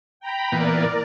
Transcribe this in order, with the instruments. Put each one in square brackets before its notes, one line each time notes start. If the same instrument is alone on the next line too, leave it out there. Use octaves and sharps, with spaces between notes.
[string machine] G5 A#5 B5
[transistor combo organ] A#2 E3 B3 [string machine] A#4 D5